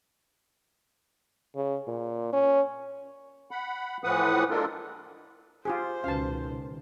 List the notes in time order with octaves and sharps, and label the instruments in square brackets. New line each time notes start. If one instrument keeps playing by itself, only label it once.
[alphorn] C#3
A#2
C#4
[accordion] F#5 B5
A2 E3 F3 B4 F#5 D#6
G#3 A#3 D4 F4 A4 A#4
[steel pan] F4 G4 G#4 [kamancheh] C5 [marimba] G#5
[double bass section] C#2 B2 D#3 [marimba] C#4 F#4 B4 [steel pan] F5 A5